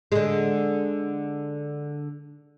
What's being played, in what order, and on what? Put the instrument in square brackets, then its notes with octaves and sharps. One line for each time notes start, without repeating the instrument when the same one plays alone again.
[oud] D3 G#3